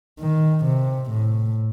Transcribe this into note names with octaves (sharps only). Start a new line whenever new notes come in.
D#3
C3
A2